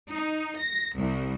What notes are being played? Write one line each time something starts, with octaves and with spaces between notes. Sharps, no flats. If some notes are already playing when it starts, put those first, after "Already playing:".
D#4
A#6
C2